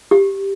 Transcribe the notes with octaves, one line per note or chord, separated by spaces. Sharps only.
G4